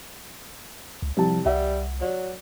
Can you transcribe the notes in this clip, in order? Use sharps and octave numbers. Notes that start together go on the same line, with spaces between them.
C#2
C2 F3 A5
C2 G3 E5 F#5
F#3 D5